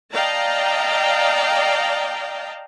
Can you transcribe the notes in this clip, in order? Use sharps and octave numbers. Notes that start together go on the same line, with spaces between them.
D5 D#5 F5 G5 A5 A#5